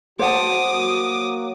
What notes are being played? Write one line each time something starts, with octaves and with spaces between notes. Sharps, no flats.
F#4 C5 F#5 A5 D6 D#6
F#3 A#3 F#4